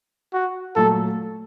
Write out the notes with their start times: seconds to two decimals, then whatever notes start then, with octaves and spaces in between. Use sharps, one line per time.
0.34 F#4
0.76 A#2 F#3 A3 A4